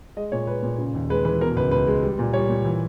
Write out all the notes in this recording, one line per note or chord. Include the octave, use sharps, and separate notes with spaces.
G#3 D#5
A#2 C#5
G#3 B4
A#2
C#3
D#2
G#3 B4
E3 B4
B2 A#4
C#2 B4
C#2 B4
G#3
G3
A#2
G3 C#5
A#2
E3